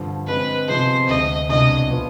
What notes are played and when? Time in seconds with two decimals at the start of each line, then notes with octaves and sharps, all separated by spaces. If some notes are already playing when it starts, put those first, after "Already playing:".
Already playing: G2 D3 F3
0.27 D3 G#3 C4 B4
0.68 C3 F3 B3 D#4 G#4 C5
1.08 D2 D3 G#3 D#5
1.49 C2 B2 G#3 D4 D#5
1.91 F3 B3 F4